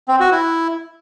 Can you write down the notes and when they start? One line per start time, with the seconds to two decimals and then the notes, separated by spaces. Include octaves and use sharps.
0.08 C4
0.20 F#4
0.32 E4